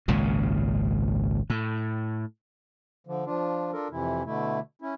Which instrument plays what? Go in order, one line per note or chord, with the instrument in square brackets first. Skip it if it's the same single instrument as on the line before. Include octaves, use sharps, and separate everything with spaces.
[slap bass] G#1 C#2 A#2 C#3
A2
[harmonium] D3 F3
F3 D4 F4
D4 F4 A4 A#4
F2 C3 E3 E4
B2 D3 A3 E4
C#4 E4